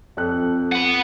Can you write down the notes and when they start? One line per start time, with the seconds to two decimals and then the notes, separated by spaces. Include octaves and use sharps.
0.17 F2 A4 F#6
0.72 F#5 B5